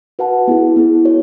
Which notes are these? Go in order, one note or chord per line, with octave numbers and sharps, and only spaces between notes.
F#4 B4 F#5 A5
B3 E4 G#4
B3 E4 G#4
F#4 C#5